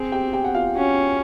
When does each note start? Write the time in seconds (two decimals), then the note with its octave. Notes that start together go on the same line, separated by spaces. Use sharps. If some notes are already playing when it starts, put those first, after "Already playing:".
Already playing: C4 G#4 G#5
0.12 G4 G5
0.33 G4 G5
0.44 F#5
0.55 F4 F5
0.76 C#4 F#4 F#5